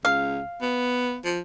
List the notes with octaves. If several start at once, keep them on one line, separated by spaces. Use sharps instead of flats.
C#2 F5
B3
F3